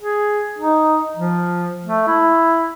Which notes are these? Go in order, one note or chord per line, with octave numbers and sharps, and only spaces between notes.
G#4
D#4
F3
A3
E4